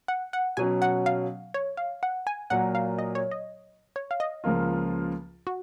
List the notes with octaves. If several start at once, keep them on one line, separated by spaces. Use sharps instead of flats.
F#5
F#5
B2 F#3 C#4 G#5
F#5
F5
C#5
F5
F#5
G#5
A#2 F#3 A#3 F#5
F5
D#5
C#5
D#5
C#5
F5
D#5
C#2 C#3 F3 A#3 F4
F#4